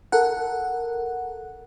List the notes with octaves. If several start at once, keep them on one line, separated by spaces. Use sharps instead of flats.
A4 A#4 F#5